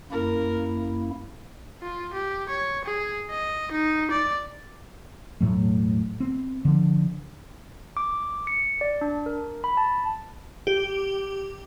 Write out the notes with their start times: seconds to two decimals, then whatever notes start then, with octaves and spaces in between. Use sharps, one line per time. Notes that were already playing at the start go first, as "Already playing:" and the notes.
0.11 F#2 A#3 E4 A#4
1.83 F4
2.14 G4
2.49 C#5
2.85 G#4
3.30 D#5
3.72 D#4
4.11 D5
5.41 E1 A2 F#3 A3
6.20 B3 C4
6.65 D3 F3
7.97 D6
8.47 C#7
8.81 D5
9.01 D4
9.26 A#4
9.64 B5
9.77 A5
10.67 G4